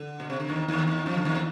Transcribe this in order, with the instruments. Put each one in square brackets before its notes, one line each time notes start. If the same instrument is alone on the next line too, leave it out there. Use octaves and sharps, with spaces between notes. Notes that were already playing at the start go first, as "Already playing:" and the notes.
Already playing: [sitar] D3
B2
C3
D3
D#2 D#3
D#2 D#3
D#2 D#3
F2 F3
D3
D#2 D#3